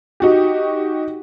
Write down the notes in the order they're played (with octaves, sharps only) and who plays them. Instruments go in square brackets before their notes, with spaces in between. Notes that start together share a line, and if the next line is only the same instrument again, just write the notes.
[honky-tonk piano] D#4 F#4 G4